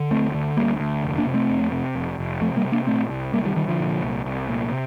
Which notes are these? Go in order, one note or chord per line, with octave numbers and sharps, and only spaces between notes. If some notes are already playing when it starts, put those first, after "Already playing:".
Already playing: D3
D2 A3 C4
D3
D2 G3 A#3
D2
F1
A#3 D4
C3
A3 C4
F2
C3
F1
F1
C3 F3 A3
G3 A#3
C3
A#3 D4
A#2 A3 C4
C2
C2 G3 A#3
D#3 G3
C2 D#3 G3
D3 F3
A#2
C2
C2
A#2
C3